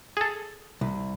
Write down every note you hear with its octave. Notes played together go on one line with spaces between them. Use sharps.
G#4 A4
C2